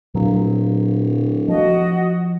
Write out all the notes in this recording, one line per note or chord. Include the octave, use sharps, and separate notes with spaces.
D1 A#2 F#3
F3 F#4 D#5